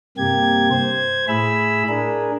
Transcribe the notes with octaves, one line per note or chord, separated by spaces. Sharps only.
G2 C3 A#3 G4 G#6
C5 G#6
A2 E4 G#4 B5 E6
D4 G#4 A#4